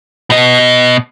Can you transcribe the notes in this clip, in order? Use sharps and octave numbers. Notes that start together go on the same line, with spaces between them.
B2 D#5